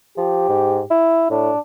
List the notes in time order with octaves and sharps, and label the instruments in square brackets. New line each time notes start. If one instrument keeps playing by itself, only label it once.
[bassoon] F3 [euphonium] G4
[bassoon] G#2
E4
[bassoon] A2 [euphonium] D4